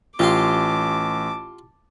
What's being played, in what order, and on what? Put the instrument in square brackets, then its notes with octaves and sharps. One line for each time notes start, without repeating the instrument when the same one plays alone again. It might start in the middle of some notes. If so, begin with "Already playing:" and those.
[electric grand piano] A1 [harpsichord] F4 G4 F5 [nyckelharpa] A5 D6